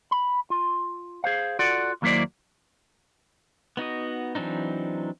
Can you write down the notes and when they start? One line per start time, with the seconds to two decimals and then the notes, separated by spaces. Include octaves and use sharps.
0.11 B5
0.50 F4
1.24 G#4 C5 F5
1.59 F4 F#4 A4 D5 F#5
2.02 D#2 F#3 A#3 E4 C5 D5
3.77 B3 D#4 F#4 D#5
4.35 E3 F#3 C4 D4 D#4